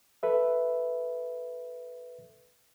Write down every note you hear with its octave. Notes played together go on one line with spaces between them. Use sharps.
A4 B4 E5